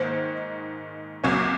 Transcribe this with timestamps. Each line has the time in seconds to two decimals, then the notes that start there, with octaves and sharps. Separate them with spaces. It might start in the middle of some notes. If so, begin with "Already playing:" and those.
Already playing: G#2 D#3 A#3 C5
1.24 C#2 C3 F#3 A#3 C#4